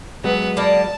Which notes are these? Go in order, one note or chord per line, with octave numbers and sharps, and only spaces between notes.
F#3 G#3 B3
A#3 B3 D5 A5